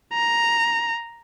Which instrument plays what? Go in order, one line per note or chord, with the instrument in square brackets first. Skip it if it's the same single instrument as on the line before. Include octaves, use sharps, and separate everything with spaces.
[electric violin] A#5